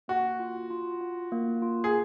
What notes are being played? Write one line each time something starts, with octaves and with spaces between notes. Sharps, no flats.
A#3 F#4
F4
F4
F4
A#3
F4
G#4